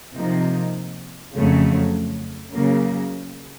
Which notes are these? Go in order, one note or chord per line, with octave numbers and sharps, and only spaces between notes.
C3 F3 A#3 D#4
F2 C#3 F#3 A3 C#4
C#3 F#3 A#3